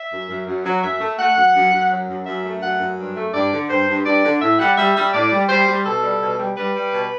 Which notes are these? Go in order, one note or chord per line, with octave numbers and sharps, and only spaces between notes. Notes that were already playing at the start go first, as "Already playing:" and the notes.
Already playing: E5
F#2
F#2
F#2
F#3
F#2 E5
A3
A3 F#5
F#2
F#2
F#2
F#3
F#2
F#2 E5
A3
F#2 F#5
F#2
G2
A3
G2 D5
D3
G2 C5
G2
G2 D5
D3
A2 E5
G3 F#5
G3 E5
G3 E5
A2 D5
G3
G3 C5
G3
B2 A4
G3
B2
G3
G3 B4
G3
B2